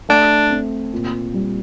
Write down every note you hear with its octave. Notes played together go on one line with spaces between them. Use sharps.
A3 D4
C4
A#2
G3